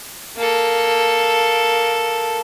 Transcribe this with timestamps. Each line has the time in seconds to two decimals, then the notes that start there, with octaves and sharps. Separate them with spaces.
0.37 A#3 A4